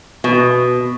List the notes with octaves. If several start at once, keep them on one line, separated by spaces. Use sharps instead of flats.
B2